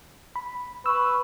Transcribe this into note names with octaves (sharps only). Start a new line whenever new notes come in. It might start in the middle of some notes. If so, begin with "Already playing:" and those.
B5
B4 C#6 E6